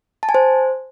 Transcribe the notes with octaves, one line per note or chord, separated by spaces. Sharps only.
A5
G#5
C5